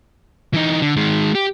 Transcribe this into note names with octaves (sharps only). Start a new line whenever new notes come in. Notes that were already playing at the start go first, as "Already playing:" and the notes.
E3 D#4
D3
D#3 G#3
G4